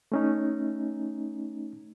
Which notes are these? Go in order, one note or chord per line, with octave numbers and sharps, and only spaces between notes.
A3 C#4 D#4